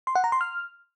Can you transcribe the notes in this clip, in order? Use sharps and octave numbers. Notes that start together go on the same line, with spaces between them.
C6
F#5
A#5
C6
F6